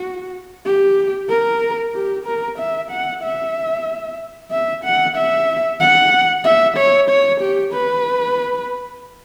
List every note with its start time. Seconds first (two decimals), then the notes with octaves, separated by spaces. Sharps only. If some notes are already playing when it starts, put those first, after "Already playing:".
Already playing: F#4
0.66 G4
1.29 A#4
1.94 G4
2.26 A#4
2.58 E5
2.91 F#5
3.23 E5
4.51 E5
4.84 F#5
5.16 E5
5.80 F#5
6.44 E5
6.77 C#5
7.09 C#5
7.41 G4
7.73 B4